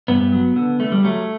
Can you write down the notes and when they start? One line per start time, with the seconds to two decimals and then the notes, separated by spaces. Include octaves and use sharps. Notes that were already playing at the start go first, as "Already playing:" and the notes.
0.08 G2 B3
0.32 F#3
0.56 D3
0.79 D3 A3
0.92 G3
1.03 F#3 A3